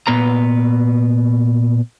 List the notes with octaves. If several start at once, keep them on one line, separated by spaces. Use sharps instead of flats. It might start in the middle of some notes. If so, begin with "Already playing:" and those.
A#2 B3 B4 A#5